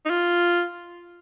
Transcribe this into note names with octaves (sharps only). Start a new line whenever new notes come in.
D#4
F4